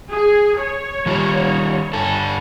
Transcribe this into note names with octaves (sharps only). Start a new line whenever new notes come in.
G#4
C#5
D#3 G3 F4
G2 D3 A4